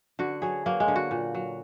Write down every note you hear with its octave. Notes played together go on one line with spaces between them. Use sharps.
D3 F#4
F#3 G#4
F#3 A#3
G#3
D3
F#4
A#2
F#3